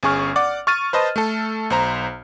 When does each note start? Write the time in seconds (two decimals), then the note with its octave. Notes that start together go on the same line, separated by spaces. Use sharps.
0.03 G1 C#4 G#4 C#6 F6
0.36 D5 F#5 D6
0.67 C#6 F6 A6 D#7
0.93 B4 C5 D#5 A5
1.16 A3 A4
1.70 B1 C5 A#5